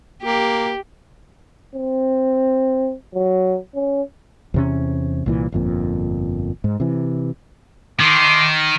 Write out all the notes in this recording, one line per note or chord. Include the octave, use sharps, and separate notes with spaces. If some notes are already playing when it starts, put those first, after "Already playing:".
A#3 G4
C4
F#3
C#4
E2 C3 C#4
C2 A#2 E3
G1 F2 A#2
G#2
C3 E3
D#3 A3 C6 D6